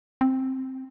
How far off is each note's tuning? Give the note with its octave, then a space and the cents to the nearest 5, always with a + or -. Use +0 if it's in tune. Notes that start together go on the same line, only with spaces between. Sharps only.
C4 +5